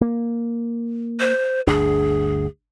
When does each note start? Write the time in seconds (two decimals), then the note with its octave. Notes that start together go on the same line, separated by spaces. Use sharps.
0.01 A#3
1.20 C5
1.67 G1 D2 D4 G#4